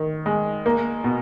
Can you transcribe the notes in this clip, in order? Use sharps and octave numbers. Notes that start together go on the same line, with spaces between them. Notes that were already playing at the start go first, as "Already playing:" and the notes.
Already playing: D#3
G#3
A#3
B2